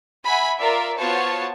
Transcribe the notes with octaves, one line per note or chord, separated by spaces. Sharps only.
E5 F#5 G#5 B5
F4 A#4 D5 E5
B3 F4 F#4 C5 C#5 A5